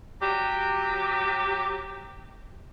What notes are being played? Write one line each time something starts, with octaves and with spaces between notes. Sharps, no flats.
F#3 G4